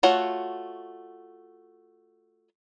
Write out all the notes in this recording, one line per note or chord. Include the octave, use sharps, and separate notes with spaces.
A3 F4 F#4 C#5 F#5